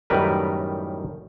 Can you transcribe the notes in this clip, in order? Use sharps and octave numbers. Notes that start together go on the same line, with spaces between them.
F#2 A2 D#3 G3 A#4 B4